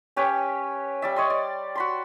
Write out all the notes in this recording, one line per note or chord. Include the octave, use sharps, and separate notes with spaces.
C#4 G4 B4 C#5
G3 D5 E5
C#5 D#5 C6
D5
F#4 B5 C6